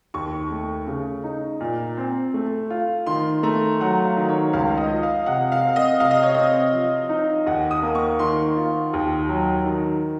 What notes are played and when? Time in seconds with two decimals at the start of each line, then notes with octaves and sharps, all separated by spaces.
0.14 D#2 C#6
0.51 A3
0.87 C#3
1.24 D#4
1.61 A#2
1.97 C4
2.34 A3
2.70 F4
3.06 D#3 C6
3.43 A3 A#5
3.80 F#3 F#5
4.05 F5
4.17 D#3
4.29 C#5
4.53 C#2 F5
4.77 D#5
4.90 F3
5.03 F5
5.26 C3 F#5
5.52 F5
5.63 C4
5.76 D#5
6.00 C3 F5
6.11 D#5
6.23 C#5
6.34 C4 D#5
6.73 F3
7.09 D#4
7.46 D#2 F#5
7.71 D#6
7.83 A#3
7.95 C#6
8.19 D#3 C6
8.56 F4
8.93 D#2
9.29 F#3
9.66 D#3